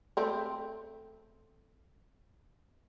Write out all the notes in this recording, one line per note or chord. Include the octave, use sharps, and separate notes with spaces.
A3 C4